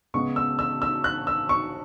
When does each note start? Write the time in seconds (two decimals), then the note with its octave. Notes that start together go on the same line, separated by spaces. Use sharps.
0.14 C#3 G#3 B3 C#6
0.36 E6
0.59 E6
0.82 E6
1.04 F#6
1.27 E6
1.49 C#6